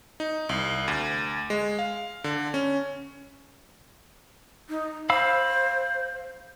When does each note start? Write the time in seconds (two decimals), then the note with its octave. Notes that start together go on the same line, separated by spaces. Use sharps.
0.20 D#4
0.49 C2
0.88 D2
1.50 G#3
1.79 F5
2.24 D3
2.54 C#4
4.69 D#4
5.10 C5 F5 B5 E6